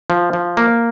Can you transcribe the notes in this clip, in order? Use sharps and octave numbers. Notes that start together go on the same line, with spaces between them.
F3
F3
A#3